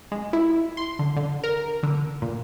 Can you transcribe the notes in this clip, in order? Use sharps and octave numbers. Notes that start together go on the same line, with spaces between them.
G#3
E4
C6
D3
D3
A#4
D3
A#2